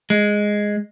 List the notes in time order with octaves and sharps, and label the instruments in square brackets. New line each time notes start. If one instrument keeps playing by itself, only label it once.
[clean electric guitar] G#3